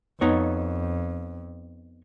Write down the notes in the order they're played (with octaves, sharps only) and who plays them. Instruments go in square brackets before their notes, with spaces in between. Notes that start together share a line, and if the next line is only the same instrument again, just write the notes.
[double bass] F2 [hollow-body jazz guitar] B3 D#4 C#5